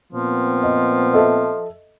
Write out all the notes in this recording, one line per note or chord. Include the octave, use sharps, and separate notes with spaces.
A#2 F3 B3 C4
D#5
A4 D#5 E5